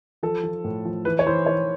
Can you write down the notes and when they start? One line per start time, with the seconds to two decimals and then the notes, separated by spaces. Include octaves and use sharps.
0.23 F3 A4
0.43 F3
0.64 A2
0.85 F3
1.05 E3 B4
1.19 C#5
1.26 E3 C5
1.46 E3 C#5